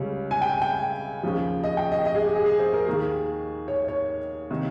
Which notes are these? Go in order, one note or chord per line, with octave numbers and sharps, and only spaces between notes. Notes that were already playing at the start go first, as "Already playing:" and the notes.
Already playing: C#2 C#3 G3 C#4
G#5
G5
G5
D#2 C#3 F3
D#5
G5
D#5
D#5
G#4
G4
G#4
G#4
C5
A#4
D#2 D#3 A#3 G#4
C#5
C#5
C3 D#3 A#3 D#4